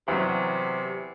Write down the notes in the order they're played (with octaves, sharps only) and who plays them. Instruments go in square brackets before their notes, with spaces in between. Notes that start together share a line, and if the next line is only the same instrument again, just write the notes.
[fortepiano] E2 F#3 [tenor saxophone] C3